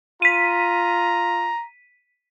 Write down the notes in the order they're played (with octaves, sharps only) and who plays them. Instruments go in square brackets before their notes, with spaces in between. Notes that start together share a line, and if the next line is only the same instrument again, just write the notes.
[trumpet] F4 [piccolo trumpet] A#5 [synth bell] B6 D#7